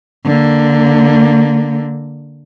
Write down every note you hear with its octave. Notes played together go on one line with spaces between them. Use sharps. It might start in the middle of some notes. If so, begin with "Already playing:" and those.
D3 A#3